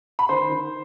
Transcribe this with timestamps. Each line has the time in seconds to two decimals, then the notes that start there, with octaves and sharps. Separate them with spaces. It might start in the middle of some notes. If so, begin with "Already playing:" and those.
0.19 B5
0.29 D#3 C5 C6
0.49 D#3